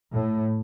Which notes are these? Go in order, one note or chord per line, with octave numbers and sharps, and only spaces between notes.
A2